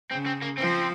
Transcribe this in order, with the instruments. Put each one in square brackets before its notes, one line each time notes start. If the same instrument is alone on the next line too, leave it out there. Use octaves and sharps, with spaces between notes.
[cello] C#3 [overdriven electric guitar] C4
[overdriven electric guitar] C4
A#3
[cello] F3 [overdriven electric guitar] C4